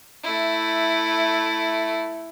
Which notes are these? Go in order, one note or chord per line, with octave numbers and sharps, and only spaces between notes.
A3 E4